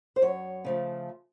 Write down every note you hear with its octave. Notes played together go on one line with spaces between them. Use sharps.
C5
F#2 C#5
C#3 F3 A3